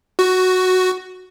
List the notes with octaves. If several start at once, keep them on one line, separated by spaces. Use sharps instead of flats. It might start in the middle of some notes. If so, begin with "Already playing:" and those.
F#4